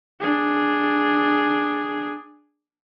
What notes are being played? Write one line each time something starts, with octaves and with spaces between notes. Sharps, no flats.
D4 G#4